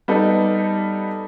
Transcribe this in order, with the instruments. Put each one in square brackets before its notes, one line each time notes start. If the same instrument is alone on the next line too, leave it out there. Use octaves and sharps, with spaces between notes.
[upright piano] G3 B3 D#4 A4